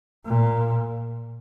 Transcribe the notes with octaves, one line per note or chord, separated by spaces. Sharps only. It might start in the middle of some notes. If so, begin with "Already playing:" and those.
A#2